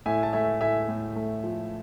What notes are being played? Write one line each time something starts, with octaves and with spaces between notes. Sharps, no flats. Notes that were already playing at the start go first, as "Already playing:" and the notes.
A2 E5 G#5
A5
A3 E5 G#5
A2 E5 G#5
A2
A3
F3